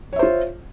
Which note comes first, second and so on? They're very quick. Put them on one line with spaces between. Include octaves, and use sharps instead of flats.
C#5 E5 C5 F4